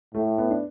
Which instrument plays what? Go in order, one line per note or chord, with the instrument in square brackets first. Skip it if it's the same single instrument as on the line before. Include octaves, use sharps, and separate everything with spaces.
[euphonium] A2 [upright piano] A3
[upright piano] B3
D4